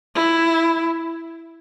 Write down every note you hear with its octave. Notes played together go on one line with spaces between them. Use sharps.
E4